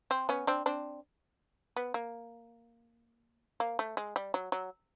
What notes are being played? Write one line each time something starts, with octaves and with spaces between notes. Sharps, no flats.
C4
B3 C#4
C4 D4
C4 D4
B3
A#3
A#3
A3
G#3
G3
F#3
F#3